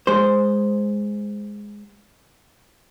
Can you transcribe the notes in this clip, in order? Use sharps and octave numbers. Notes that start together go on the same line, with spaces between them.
G#3 C5